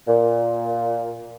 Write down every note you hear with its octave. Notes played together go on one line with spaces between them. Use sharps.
A#2